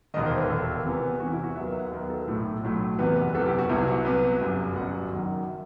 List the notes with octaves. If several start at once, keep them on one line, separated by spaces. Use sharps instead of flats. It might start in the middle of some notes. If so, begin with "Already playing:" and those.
E1 D#2 D#3 D#5
C5
B4
E1 D#2 D#3 A4
E2 C3 E3 B3
E2 C3 E3 B3 F#4
E4
F#4
D#2 D#3 F#3 B3 E5
E5
F#5
D#2 D#3 F#3 B3
A4
B1 A2 F#3 A3
B1 A2 F#3 A3
F#1 E2 C3 E3 B3 B4
B4
F#1 E2 C3 E3 B3 A4
G4
F#4
C2 C3 F#3 B3 E4
F#4
C2 C3 F#3 B3 B4
G1 F#2 F#3
G1 F#2 F#3 F#5
F#1 F#2 D#3
E5